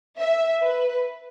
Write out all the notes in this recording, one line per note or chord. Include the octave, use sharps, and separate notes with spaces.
E5
B4